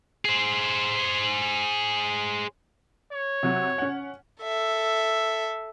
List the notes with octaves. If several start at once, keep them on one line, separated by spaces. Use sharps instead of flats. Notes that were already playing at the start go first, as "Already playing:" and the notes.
G#4 C5
C#5
C3 F#3 F#4
C#4 F#5
A4 E5